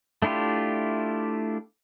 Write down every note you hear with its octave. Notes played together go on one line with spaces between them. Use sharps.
A3 D4 E4 F4 G4